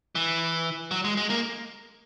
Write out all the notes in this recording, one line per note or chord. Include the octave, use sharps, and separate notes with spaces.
E3
F#3
G#3
G#3
A#3